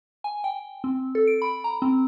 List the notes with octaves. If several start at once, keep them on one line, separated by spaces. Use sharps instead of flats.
G#5
G5
C4
A4
D7
B5
A#5
C4